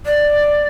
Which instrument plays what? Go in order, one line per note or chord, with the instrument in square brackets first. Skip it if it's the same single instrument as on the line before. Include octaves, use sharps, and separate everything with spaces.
[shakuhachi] D5